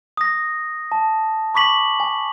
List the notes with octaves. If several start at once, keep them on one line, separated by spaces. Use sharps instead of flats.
D#6 A#6
A5
B5 C#6 D6 B6 F#7
G#5